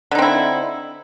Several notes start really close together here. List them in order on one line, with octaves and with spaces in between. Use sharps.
D3 D#4 C4 E4